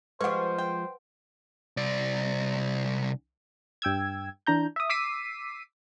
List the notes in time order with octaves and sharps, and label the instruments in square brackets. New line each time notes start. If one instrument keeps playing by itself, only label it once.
[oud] F3 G#3 [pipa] G4 C#6 [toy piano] B4 F#5 [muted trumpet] C5
[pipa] G5
[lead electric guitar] C2 D5
[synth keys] G2 G5 E6 G#6
E3 D4 A#5 G6
E5 D#6
D6 E6 B6 C7 D#7